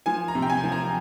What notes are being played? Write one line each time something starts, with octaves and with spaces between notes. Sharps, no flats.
F3 G#5
A#5
C3
G5
G#5
F3
A#5